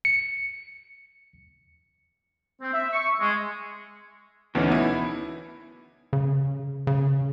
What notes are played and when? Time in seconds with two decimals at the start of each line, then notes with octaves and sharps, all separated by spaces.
0.05 C#7
2.62 C4
2.73 E5
2.93 C#6
3.20 G#3
4.55 D2 B2 D#3 E3 C#4
4.70 B3 E4
6.13 C#3
6.87 C#3